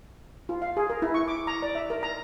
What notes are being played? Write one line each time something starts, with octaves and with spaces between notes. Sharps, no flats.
F4
F5
G#4
A#4
E4
C#6
D6
A#5
D5
E5
A#4
A#5